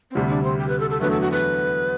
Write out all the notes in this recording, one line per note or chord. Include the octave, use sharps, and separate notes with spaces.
C4
D2 C3 G3 D4
D4
C4
G4
B4
A4
A4
E2 D3 F#3 A3 B4
A4
F#4
B4